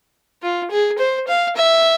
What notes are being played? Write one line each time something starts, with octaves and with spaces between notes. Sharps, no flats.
F4
G#4
C5
F5
E5